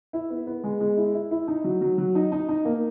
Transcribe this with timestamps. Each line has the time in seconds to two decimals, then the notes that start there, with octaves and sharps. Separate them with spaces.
0.13 E4
0.30 B3
0.47 B3
0.64 G#3
0.81 G#3
0.97 E4
1.14 E4
1.31 E4
1.48 D#4
1.64 F#3
1.81 F#3
1.98 F#3
2.15 D#4
2.32 D#4
2.49 D#4
2.65 A#3